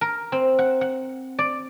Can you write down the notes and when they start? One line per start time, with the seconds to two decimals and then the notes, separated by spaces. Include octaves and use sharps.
0.01 A#4
0.32 C4
0.59 F#5
0.81 F#5
1.39 D5